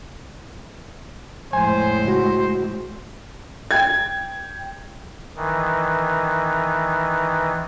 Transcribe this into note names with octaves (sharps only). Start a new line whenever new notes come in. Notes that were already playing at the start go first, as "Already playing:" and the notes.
F2 A2 G#3 C5 G#5
C#2 F#4
G5 G#6
D#3 E3